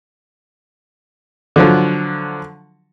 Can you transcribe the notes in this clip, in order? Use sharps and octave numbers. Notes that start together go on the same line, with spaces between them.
D3 F3 F#3